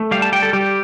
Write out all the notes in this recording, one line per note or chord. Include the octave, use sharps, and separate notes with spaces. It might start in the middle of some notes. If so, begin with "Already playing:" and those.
Already playing: A3
G3 F5
A5
G3 G5
A4
G3 G4